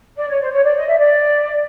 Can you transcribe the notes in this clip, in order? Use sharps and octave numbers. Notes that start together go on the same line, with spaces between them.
D5
C#5
C5
C#5
D5
D#5
E5
D5